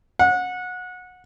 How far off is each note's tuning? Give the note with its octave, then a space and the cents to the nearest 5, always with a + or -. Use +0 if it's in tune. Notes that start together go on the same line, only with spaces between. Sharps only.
F#5 -25